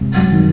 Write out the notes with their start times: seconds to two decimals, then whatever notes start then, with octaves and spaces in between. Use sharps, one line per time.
0.01 C3
0.16 F#3
0.31 D#3